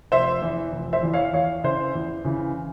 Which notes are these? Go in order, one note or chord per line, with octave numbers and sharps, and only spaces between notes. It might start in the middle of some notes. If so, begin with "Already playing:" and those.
F1 C5 E5
E2 E3
F1
C5 E5
E2 E3
C#5 F5
E2 C#5 F5
C#3 E3 C5 E5
E2
C#3 E3